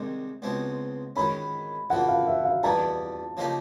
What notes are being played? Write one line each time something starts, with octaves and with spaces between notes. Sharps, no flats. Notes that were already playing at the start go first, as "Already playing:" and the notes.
Already playing: C2 C3 D#3 G#3 C4
C#2 B2 G#3 C4
D#3 G#3 C#4 B5
C#3 F3 A#3 F#5
F5
E5
F5
E2 B2 G3 B3 A5
C#3 F3 A#3 D#4 G4